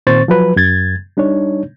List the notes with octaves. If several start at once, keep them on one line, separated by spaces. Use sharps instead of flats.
A#2 D#3 C4 C5 C#6 A6
F3 F#3 B4
F#2 G#6 A6
G3 D4 D#4 C#5